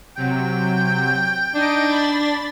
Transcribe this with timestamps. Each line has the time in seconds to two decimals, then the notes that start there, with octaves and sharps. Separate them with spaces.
0.17 C3 F#3 G5
1.55 D4 D#4 D#5 D7
1.88 B5 A6